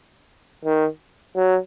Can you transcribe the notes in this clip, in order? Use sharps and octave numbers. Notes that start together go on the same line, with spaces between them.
D#3
F#3